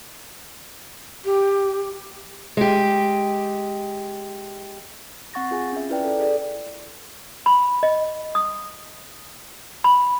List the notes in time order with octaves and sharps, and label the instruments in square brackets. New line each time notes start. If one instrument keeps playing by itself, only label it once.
[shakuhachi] G4
[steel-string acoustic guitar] G#3 G4
[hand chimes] C4 F#5 C#6 A6 A#6
F4 G#4 G#5
C#4 F4 E5
E4 B4 D5 G5
A4 D5
G#4 A4 D5
[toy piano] B5
D#5
D#6
B5